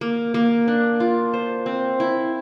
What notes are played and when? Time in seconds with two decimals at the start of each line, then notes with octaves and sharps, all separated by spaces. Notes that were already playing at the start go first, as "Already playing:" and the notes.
0.01 A#3
0.34 A#3
0.68 D4
1.00 F4
1.34 C5
1.66 C4
2.00 E4